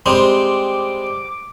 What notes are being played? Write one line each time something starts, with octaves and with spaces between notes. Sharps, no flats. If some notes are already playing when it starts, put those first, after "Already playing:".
G3 G#3 C4 D6